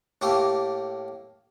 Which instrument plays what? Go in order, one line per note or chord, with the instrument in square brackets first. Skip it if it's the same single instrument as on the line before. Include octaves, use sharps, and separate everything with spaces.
[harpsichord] A2 A3 A#3 G4